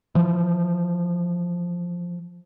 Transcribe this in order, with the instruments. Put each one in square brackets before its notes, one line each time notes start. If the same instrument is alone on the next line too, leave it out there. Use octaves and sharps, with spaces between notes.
[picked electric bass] E3 F3